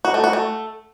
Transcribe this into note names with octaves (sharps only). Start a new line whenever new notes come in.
F#4
A3
F#4
A3